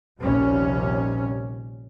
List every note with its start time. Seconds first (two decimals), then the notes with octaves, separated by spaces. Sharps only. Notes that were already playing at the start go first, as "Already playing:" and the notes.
0.21 A#1 D#2 C3 G3 C#4